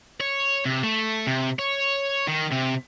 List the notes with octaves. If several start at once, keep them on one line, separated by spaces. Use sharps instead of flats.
C#5
C3
A3
C3
C#5
D#3
C3